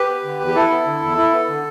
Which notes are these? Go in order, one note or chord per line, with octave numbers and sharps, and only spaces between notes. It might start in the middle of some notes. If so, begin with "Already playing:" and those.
Already playing: G4 B4
B3
D3
E2
G4
E4 A4
B3
D3
E2
E4
B3
D3